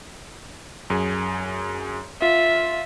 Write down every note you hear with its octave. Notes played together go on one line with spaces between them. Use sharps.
F#2 G#4
F4 E5